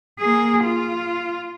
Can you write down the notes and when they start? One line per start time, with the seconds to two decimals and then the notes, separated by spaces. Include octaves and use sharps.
0.19 A#3 G#4
0.64 F4